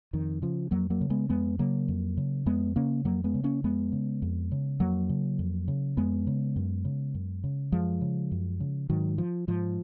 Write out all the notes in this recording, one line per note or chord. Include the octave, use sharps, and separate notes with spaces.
F2 D#3
C#3 F3
F2 F#3 A#3
F#3 A#3
C#3
G#3 B3
F2 G#3 B3
C#3 F#3 A#3
F2
C#3
F2 G#3 B3
C#3 A#3 C#4
F2 F#3 A#3
G#3 B3
C#3
A#3 C#4
F2 G#3 B3
C#3
F2
C#3
F2 F#3 A#3
C#3
F2
C#3
F2 G#3 B3
C#3
F#2
C#3
F#2
C#3
F#2 F3 G#3
C#3
F#2
C#3
G#2 D#3 F#3
F3
G#2 F3